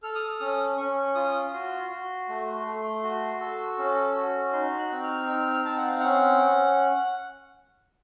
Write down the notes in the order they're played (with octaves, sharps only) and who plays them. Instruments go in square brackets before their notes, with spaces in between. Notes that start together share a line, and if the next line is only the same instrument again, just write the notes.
[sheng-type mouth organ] A4 F6
D#6
F6
C#4 D#6
C#4 C#6
F4 D#6
F#4 C6
F#4
A3
A3
F#4
A4
C#4
F#4
D#4 C6
F#6
C4
F6
D#4 F6
C4 A5
F#5
F5
C#4 F#5